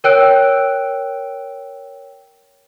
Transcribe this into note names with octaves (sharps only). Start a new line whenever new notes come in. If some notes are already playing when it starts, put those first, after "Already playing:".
A#4 C#5 G5 E6 F#6 D7